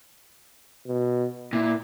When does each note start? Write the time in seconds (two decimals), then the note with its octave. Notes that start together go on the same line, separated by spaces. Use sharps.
0.87 B2
1.53 A#2 E4